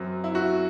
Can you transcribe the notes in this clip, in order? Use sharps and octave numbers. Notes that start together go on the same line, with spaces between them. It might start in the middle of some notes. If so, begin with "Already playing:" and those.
Already playing: F#2 F#3 C4
E4
F#4